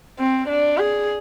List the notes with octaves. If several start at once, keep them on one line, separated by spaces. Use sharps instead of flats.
C4
D4
G#4